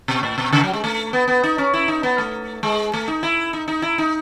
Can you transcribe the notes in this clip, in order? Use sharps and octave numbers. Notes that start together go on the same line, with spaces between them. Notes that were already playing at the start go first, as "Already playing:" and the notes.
B2
A2
B2
C#3
F#3
G#3
A3
B3
B3
D#4
C#4
E4
D#4
B3
A3
G#3
A3
D#4
E4
D#4
D#4
E4
D#4